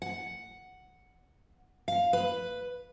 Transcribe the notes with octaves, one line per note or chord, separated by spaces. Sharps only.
F#5
F5
B4